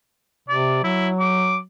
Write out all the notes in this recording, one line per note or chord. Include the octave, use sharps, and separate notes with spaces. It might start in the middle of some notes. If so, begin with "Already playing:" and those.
C3 D5
F#3 E4
D6